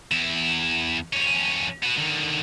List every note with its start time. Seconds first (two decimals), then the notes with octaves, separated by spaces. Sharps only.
0.12 E2 E4
1.13 F2 C#4
1.84 B3 F#4
1.98 D3 D#3